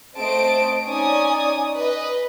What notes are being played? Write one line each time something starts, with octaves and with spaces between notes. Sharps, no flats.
A3 C4 D#5 A5 D7
C#4 D#4 D5 G#5 D#6
B4 D#5